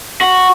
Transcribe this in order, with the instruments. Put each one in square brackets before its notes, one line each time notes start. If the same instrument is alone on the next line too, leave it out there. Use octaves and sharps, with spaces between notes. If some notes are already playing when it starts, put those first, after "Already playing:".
[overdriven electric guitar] F#4